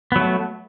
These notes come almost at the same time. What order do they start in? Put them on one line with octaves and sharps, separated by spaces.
B3 F#3 A3